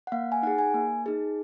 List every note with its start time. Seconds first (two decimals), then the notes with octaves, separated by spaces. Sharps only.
0.07 F#5
0.12 A#3 F5
0.32 G#5
0.43 D#4 F#5
0.47 G#4
0.58 G#5
0.74 A#3
1.06 D#4 G#4